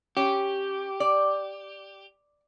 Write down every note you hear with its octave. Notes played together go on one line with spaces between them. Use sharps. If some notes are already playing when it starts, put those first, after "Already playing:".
C#4 G4
D5